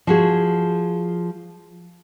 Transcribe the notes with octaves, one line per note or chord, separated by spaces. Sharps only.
F3 F#4 G#4